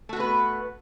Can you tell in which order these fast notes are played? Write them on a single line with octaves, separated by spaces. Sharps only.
A3 F#4 B3 B4